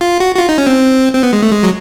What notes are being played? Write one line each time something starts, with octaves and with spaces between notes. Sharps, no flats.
F4
F#4
F#4
F4
D#4
C#4
C4
C4
B3
G#3
A3
G#3
F#3